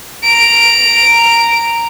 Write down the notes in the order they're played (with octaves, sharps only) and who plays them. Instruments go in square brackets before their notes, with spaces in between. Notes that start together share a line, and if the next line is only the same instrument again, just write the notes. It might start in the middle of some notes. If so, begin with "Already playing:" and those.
[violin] A#5 D7